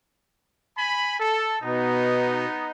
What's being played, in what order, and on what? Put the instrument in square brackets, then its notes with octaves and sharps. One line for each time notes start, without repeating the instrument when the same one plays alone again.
[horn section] G#5 B5
A4
[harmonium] B2 [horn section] B3 D#4